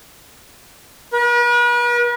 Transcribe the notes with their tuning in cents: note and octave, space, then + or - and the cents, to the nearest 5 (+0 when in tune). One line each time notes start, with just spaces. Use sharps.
B4 -45